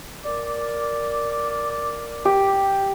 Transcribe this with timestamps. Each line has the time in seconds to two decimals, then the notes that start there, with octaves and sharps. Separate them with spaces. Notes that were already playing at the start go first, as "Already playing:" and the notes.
0.24 A#4 D5 D6
2.25 G4